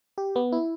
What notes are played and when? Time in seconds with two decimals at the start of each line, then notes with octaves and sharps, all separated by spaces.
0.18 G4
0.36 B3
0.52 E4